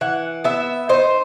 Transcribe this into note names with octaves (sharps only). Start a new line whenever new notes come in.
E3 F#5
B3 E5
D#4 C5